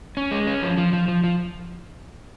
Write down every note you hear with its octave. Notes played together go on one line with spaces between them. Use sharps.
C#4
G#3
C#4
F3
F3
F3
F3
F3